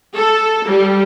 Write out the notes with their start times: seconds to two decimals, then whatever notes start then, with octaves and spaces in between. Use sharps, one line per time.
0.15 A4
0.68 G3